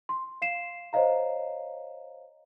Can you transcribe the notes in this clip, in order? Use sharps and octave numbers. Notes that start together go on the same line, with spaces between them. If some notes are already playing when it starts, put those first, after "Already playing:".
C6
F5 C7 E7
C5 C#5 D#5 F5 A#5